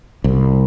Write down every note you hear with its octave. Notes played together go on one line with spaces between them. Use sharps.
C2